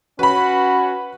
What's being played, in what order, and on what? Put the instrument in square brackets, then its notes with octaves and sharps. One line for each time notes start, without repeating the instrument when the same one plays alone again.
[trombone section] C#4 F#4 [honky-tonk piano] B4 B5